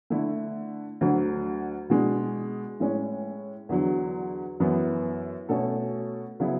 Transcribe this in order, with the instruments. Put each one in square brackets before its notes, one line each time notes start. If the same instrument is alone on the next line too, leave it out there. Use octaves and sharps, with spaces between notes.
[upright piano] D3 A3 E4
D2 D3 F#3
B2 G#3 D4
A2 G#3 C#4
E2 D3 F#3
F#2 E3 B3
B2 A3 C#4 F#4 A4
C#3 F#3 B3 E4